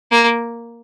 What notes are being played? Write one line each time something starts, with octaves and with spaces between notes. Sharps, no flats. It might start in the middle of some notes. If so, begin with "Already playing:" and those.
A#3